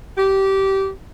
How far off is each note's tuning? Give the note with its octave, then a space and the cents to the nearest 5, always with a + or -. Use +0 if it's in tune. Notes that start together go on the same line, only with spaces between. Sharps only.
G4 -20